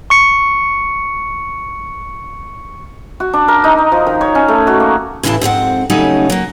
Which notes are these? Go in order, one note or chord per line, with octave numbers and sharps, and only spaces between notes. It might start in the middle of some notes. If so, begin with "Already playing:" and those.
C#6 C#7
F#4
D4
A#4
D#4
D#5
F3
D#3
C#5
C#4
A3
F#4
A#3
A2 C#3 E3 E4 G4 A5
F2 G#2 C4 F#5
C#3 F#3 G3 A3 C#4 D#4
F#3 A#3